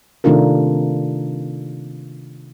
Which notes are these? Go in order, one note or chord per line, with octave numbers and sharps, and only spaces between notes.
C3 D#3 A3 D4 F4 A#4